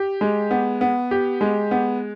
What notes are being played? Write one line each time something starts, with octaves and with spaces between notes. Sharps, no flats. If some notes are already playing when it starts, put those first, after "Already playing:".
Already playing: G4
G#3
B3
B3
G4
G#3
B3